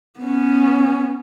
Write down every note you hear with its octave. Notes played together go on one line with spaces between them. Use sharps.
B3 C#4